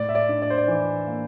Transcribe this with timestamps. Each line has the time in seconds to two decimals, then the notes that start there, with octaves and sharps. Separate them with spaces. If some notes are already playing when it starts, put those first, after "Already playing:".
Already playing: A2 D5
0.09 E5
0.15 D5
0.29 D4
0.42 D5
0.50 C5
0.58 D5
0.68 E3
1.07 A#3